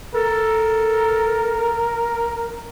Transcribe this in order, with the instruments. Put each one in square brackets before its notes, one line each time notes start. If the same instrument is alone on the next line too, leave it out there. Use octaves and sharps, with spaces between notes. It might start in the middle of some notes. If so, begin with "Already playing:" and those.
[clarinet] A4 [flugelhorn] A#4